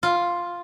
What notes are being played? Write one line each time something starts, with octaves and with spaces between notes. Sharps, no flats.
F4